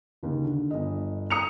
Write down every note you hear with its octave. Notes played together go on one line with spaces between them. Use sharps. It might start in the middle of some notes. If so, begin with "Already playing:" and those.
D#2 C#3
D3
G1 D#5
A#5 D#6 C#7 F7